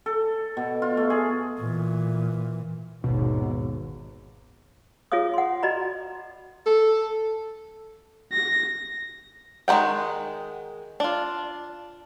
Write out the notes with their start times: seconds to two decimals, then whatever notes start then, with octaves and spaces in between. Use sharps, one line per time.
0.06 A4
0.57 B2
0.82 F4
0.97 A3
1.10 G#4
1.60 A#2 E3
3.04 G#1 D#2 B2
5.12 F4 G#4 C#5 F5 D#6
5.34 F#5 C6
5.63 F#4 D5 D#5 A#5 B5
6.66 A4
8.33 A#6
9.68 D#3 G#3 B4 F#5 G5
11.00 D4 F4